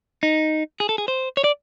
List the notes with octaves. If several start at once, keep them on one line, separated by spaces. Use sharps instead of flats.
D#4
G#4
A4
G#4
C5
C#5
D5